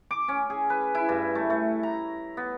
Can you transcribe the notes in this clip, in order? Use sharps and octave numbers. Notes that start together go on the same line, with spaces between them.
D6
C#4
G#4
B4
E4
G2
A3
A3
A#5
B3